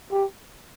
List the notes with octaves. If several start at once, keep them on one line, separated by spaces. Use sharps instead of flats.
G4